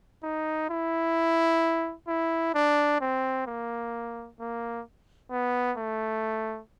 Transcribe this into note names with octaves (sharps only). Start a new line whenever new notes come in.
D#4
E4
E4
D4
C4
A#3
A#3
B3
A3